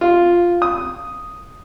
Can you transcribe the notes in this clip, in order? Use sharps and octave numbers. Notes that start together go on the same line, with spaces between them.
F4
D#6